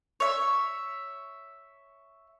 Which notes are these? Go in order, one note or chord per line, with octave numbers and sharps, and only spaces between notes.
C#5 E5